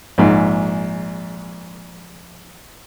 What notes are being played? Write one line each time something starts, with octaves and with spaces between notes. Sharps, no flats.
A#1 G#2